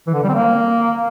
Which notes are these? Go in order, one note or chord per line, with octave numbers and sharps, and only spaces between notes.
E3
D3
G3
C4
A#3